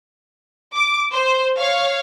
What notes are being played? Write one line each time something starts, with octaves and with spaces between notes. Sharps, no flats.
D6
C5
C#5 F5